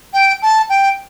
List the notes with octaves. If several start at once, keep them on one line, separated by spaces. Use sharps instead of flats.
G5
A5
G5